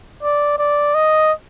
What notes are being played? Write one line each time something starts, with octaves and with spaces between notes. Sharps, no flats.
D5
D5
D#5